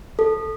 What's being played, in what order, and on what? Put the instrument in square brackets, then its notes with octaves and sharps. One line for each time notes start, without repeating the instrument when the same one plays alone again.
[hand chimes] A4